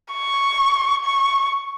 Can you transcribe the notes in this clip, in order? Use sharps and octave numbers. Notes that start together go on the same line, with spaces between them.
C#6
C#6